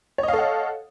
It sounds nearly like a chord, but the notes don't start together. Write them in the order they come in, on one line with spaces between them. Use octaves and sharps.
C#5 D#5 F5 A4 F#5